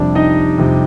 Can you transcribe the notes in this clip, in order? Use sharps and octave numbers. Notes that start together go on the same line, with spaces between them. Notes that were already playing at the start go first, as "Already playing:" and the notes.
Already playing: F2 C3 G3 D4 D5
D#4 D#5
F2 C3 G3